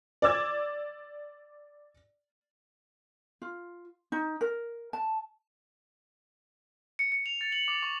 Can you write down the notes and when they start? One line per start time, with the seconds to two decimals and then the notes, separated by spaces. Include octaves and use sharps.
0.22 D5 D6 E6 G#6
3.42 F4
4.12 D#4
4.41 A#4
4.93 A5
6.99 C#7
7.12 C#7
7.26 F7
7.41 A6
7.52 F#7
7.68 D6
7.83 C#6